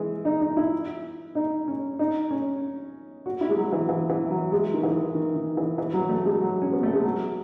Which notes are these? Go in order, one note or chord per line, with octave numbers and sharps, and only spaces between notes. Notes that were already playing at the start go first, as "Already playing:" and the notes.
Already playing: E3 G#3
D#4
D#4
E4
D#4
C#4
D#4
C#4
F#4
E4
G#3
F#3
E3
E3
E3
F#3
G#3
D#3
E3
D#3
D#3
E3
E3
F#3
A3
G#3
F#3
C#4
B3
A3
G#3
F#3